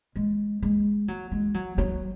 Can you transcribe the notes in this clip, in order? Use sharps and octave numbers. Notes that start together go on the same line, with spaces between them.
G#3
G#3
F#3
G#3
F#3
F#3